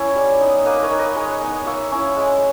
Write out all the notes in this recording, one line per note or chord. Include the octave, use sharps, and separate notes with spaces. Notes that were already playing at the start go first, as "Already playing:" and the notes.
Already playing: A#3 C#4 E4
G3
B3 D#4
A#3 B4 D#5
B4
A#4 C#5
D#4
B4 D#5
G#3 A#4 C#5
B3 D#4 B4 D#5
A#3 C#5 E5
C#4 E4
G#3